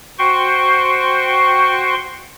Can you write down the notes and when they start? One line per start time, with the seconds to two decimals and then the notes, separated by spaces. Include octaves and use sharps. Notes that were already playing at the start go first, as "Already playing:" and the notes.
0.19 F#4 C5 G5 C6 C#6